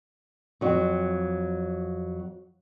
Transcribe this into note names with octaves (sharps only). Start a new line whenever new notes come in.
F2 F#3